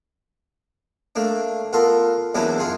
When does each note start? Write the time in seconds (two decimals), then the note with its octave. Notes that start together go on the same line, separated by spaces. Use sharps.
1.16 A3 A#3 D4
1.73 B3 F4 A4 A#4
2.34 E2 F#3 A#3 C#4 D4 E4
2.58 F#2 F4 G#4